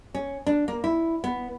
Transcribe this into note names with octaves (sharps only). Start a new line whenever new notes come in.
C#4
D4
A#3
E4
B3